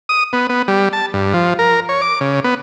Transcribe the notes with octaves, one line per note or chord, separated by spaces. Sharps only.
D#6
B3
B3
G3
A5
G2
F3
A#4
C#5
D6
C#3
B3